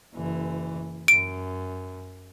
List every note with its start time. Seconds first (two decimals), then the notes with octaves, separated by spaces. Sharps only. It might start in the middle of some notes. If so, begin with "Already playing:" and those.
0.14 F#1 E3
1.08 F#2 D7